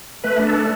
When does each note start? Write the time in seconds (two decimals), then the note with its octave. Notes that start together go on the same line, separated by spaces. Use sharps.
0.24 A3 B4
0.40 D4
0.47 A4
0.55 A3